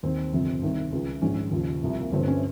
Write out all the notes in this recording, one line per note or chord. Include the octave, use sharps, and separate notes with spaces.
D#2 D#3 C4
G1 F2 C3
C2 C3 D#3
C#2 C#3 F3
A#1 G#2 D#3 C#4
D#2 C#3 F3
C2 C3 F3
A#3
G1 G2 F3 C4
C#4